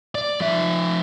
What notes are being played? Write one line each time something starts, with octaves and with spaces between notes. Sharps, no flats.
D5
F3 E5